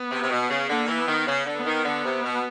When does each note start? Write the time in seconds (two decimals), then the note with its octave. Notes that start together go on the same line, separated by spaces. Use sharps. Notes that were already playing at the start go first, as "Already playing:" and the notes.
Already playing: B3
0.11 C3
0.22 C3
0.30 B2
0.50 C#3
0.70 D3 A#3
0.84 D#3
0.88 E3
0.98 B3
1.08 D#3
1.27 C#3
1.46 D3
1.56 B3
1.66 D#3
1.85 D3
2.05 C3
2.23 B2